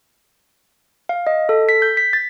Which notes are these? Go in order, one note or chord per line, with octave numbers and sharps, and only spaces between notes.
F5
D#5
A4
B6
G6
B6
A6